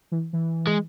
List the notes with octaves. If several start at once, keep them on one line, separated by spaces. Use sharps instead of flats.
E3
E3
G#3